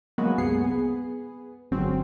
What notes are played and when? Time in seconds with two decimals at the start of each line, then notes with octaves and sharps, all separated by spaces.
0.18 F#3 G#3 A#3 B3 F#4 B4
0.38 C2 F#2 B3 G#4 C7 C#7
0.62 B3 G#4
1.71 G1 G#2 F#3 C4 C#4